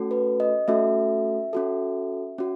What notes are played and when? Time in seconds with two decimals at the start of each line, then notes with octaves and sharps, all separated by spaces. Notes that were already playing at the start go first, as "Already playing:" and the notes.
Already playing: A3 C#4 F#4 A4
0.11 B4
0.40 D#5
0.68 A3 C#4 F#4 A4 E5
1.53 C#4 F#4 A4
2.38 C#4 F#4